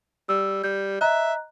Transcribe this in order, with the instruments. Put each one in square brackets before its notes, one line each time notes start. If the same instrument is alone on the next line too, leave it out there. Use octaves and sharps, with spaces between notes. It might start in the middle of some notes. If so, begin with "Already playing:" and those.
[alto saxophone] G3 [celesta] E6
[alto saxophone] G3 [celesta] G6
[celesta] D#5 A#5 F#6 [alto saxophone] E5